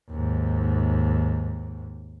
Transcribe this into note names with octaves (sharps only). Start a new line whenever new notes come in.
D#2 G#2